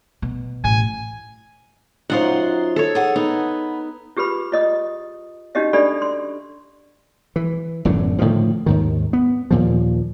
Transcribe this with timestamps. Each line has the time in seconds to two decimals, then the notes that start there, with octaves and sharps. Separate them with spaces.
0.22 B2
0.64 A1 G#5
2.10 F#2 D#4 F4 C5 F#5
2.76 A4 C#5
2.95 G#4 F#5
3.16 B3 D#4
4.17 F4 G4 G#4 B4 B5
4.52 F4 D#5 D#6
5.55 C#4 D#4 F#4 G4 D#5 E5
5.73 D4 G4 A4 D5 E5 B5
6.02 C6
7.36 E3
7.85 E1 F#2 A2 D3
8.19 A2 D3 D#3 F3
8.66 D#2 G#2 D#3
9.13 B3
9.51 D#2 A#2 F3